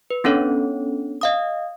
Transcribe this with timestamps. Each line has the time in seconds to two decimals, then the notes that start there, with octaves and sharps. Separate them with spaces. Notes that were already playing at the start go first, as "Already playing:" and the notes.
0.10 B4
0.24 B3 C#4 D4 A4 C#5
1.21 D#5 F5 D#6